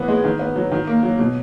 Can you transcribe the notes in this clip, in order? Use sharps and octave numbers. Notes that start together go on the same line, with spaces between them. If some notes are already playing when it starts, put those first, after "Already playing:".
Already playing: E3 B3
G#3
D#3
B3
F#3
D#3
A#3
F#3
B2